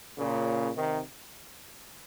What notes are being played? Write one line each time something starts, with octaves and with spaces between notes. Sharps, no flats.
A#2 C#3
C3 D#3